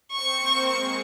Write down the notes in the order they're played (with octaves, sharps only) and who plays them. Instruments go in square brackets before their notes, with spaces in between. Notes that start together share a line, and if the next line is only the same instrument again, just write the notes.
[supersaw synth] C4 C5 [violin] C#6
[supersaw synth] A#3 A#4
[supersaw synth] G#3 G#4 [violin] C#6